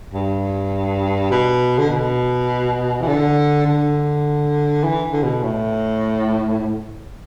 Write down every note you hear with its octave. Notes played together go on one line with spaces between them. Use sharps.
G2
B2
D3
B2
E3
D3
D3
E3
D3
B2
A2